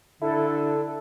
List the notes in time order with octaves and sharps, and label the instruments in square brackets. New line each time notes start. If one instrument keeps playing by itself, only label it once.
[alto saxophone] D3 [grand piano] E4 [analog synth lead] A4